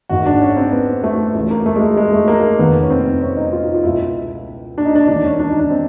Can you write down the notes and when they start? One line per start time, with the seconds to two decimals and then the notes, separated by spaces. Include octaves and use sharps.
0.09 G#1 G#2 D#3 F#4
0.26 D4
0.42 C#4
0.57 C4
0.72 B3
1.04 A3
1.34 C#2 C#3 E3 A3
1.50 A#3
1.66 A3
1.76 G#3
1.81 A3
1.97 G#3
2.13 A3
2.28 A#3
2.59 F1 D#2 D#3 B3
2.83 C#4
2.90 C4
3.21 C#4
3.37 D#4
3.53 F4
3.74 F4
3.83 C#2 B2 E4
4.78 D4
4.85 D#4
4.95 D4
5.08 E1 D#2 D#3 D4
5.24 C#4
5.39 D4
5.49 D#4
5.59 D4
5.70 C4